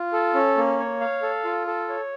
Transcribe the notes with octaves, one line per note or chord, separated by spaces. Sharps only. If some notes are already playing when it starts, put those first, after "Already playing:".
Already playing: F4
A4
C#4
A#3
C#5
F5
A4
F4
A4
C#5